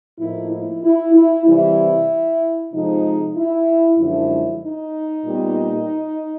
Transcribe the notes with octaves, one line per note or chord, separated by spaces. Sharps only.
A2 F3 A#3 D#4 E4
E4
E4
E4
C3 E3 G3 E4
C3 F3 G#3 D#4
E4
F#2 D3 F3 G#3 E4
D#4
A#2 G3 B3